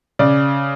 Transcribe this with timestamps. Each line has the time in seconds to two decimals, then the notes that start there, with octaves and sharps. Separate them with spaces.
0.19 C#3 D5